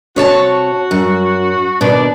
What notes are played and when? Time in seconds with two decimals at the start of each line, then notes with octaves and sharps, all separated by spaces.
0.16 C3 F#4 C#5 A5
0.91 F#2
1.81 D#2 B2 D4